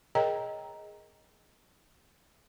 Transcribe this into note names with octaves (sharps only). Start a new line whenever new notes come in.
G#4 A#4 C#5 D#5 G5 A#5